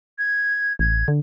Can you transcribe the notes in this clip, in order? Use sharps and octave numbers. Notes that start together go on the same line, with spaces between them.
G#6
A1 G#6
D3